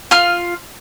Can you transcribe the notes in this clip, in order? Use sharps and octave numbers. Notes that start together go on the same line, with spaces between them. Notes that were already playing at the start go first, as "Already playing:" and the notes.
F4 F6